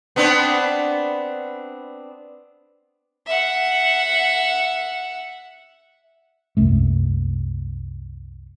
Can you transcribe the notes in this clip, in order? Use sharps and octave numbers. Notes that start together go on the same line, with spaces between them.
B3 C4 D4
E5 F#5
C2 F#2 A3